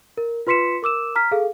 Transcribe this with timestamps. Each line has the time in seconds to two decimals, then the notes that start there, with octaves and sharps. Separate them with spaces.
0.17 A#4
0.47 F4 B4 C6 B6 C#7 E7
0.83 A#4 D6 E6 E7
1.16 A#5 F6 B6
1.31 G#4 A4 F5